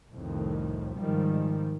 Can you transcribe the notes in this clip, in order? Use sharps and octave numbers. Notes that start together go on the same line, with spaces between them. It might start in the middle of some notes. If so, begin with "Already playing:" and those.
C2 F2 A2 D#3
G#2 D#3 F3 G3